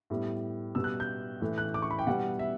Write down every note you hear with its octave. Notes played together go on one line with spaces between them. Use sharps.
A2 G3 B3
B2 G3 B3 E6
F#6
G6
A2 E3 A3
F#6
D6
C#6
B5
G5
B2 G3 B3 F#5
E5